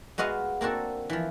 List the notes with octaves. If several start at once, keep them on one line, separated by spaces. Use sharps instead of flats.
G#3 B3 F#4 D#5 F5
A#3 C4 D4 F#4 A4
E3 F3